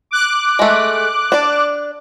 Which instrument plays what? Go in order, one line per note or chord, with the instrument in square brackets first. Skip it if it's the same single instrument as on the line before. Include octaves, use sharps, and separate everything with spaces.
[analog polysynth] D6 F#6
[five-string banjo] G#3 A3
D4 D5